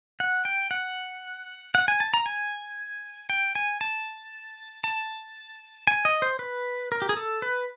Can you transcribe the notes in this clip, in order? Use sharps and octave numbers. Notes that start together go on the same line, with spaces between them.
F#5
G5
F#5
F#5
G#5
A5
A#5
G#5
G5
G#5
A5
A5
G#5
D#5
C5
B4
A#4
G4
G#4
A4
B4